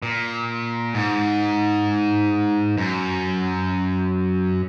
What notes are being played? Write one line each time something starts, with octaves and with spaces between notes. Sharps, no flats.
A#2
G#2
F#2